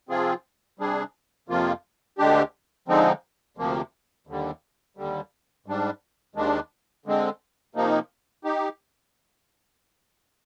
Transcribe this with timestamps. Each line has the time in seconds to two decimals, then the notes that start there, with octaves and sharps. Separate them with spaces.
0.09 C3 F3 C4 F4 G#4
0.79 C3 G3 D4 G#4
1.48 F2 C3 F3 A#3 F4
2.18 D2 D3 G#3 D4 G4
2.88 D3 F3 G#3 C4 D#4
3.57 D2 C3 F3 A#3
4.27 D#2 D3 G3
4.97 D#2 D3 G3
5.66 G#2 G3 D4
6.35 D#2 D#3 G#3 D4
7.06 D3 G#3 C4
7.75 C3 F3 A#3 D#4
8.44 D#4 G4